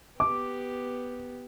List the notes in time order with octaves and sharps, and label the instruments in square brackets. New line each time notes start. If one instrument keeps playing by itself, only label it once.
[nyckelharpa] B3 G4 [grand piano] D6